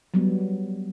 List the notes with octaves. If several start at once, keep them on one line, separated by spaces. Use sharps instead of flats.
F#3 G3 B3